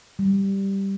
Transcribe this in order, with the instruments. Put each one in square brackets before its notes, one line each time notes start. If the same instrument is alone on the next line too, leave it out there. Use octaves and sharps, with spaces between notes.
[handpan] G3